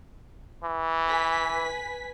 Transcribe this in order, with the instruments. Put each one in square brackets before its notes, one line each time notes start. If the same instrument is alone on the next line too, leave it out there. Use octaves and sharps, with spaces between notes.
[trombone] E3
[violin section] B4 G#5 B6